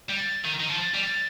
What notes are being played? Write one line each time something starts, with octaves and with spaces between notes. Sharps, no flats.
G3
D#3
D#3
F3
G3